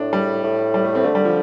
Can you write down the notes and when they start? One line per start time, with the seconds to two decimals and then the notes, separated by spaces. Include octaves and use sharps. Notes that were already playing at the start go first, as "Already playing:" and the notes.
Already playing: A2 D4
0.13 G3
0.44 A2
0.74 G3
0.85 A3
0.95 C4
1.04 D3 A3
1.15 G3
1.25 F3